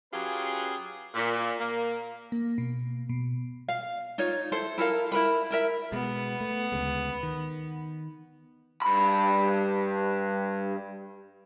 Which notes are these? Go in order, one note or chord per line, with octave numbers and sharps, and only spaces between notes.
F#3 C#4 F4 G4 G#4 B4
A#2
A#3
A#3
B2
B2
F5
D#4 F4 C#5
E4 A4 C5
E4 A4 A#4 F5
E4 A#4 B4 B5
E4 A#4 E5
B2 G#3 B3
A3
D2 C#3 G#3
D#3
G2 B5